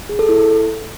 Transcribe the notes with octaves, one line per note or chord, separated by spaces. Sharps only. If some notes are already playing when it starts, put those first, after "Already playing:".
G#4
A4
E4